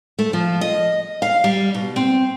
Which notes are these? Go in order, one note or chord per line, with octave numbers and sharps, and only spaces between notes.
A3
F3
D#5
F5
G3
B2
C4